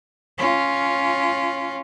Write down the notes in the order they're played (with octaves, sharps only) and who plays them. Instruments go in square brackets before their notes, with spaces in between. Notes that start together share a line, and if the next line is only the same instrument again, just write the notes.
[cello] C#4 F4